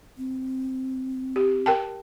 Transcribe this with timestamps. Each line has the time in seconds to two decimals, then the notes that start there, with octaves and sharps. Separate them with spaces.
0.18 C4
1.36 G4
1.66 A#4 G5 A5